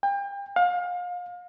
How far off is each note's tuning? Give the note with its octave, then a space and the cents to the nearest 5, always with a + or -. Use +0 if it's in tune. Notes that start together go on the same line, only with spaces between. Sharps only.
G5 +35
F5 +35